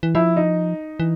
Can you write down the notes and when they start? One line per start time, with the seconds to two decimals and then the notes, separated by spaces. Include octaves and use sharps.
0.03 E3
0.15 F3 E4
0.36 D#4
1.00 E3